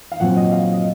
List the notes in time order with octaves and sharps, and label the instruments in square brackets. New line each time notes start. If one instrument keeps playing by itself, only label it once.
[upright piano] F5
A#2 F#3 C4 F#5
D#5
F5
D#5